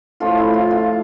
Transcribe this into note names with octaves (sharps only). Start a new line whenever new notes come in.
A2 F3 A3 F4
E4
F4
F4